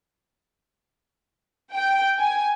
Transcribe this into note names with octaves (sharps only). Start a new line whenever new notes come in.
G5
G#5